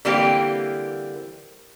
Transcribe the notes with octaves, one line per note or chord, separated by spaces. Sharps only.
D3 E3 G3 A#3 C4 G4